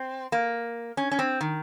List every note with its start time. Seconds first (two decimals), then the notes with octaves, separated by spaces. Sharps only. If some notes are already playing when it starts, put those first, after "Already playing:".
Already playing: C4
0.32 A#3
0.97 C#4
1.11 C#4
1.19 C4
1.41 D#3